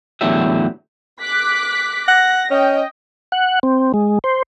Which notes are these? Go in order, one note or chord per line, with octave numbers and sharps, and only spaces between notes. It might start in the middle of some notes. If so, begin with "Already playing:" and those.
E2 A2 D3 F#3 G4 E5
D6 F#6 B6
F#5 A#6
C#4 D#5 G5
F#5
C4
G#3
C5